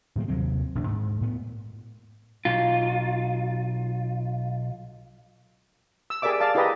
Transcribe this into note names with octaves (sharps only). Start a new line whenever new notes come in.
A2 D#3 G3 A#3
D#2 C3 F#3 C4
A#1 D#2 D4
G#2
A2 B3
B1 F4
E6
G4 G#4 A#4 D5 E5 D6
D5 F5 A5
E4 G4 G#4 B4 D#5 A#5